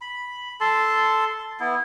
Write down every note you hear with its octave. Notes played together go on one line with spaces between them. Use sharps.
B5
A4 A5 C6
B3 E4